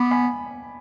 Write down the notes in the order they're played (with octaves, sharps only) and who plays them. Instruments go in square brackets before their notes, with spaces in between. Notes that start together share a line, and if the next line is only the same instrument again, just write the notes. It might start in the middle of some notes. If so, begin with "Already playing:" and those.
Already playing: [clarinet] B3 [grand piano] B5 D6
[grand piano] G#5 B5